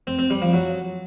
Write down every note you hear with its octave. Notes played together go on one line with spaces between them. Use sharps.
C4
C4
G3
F3
F#3